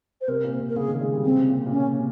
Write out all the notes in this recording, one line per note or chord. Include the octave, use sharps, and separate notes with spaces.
C5
C3 A#4
A#2
C3
A#4
C#3 G#4
D#3
G#3
G3
C#3 C4
C3
A#2
C3
A#2
C3 C#4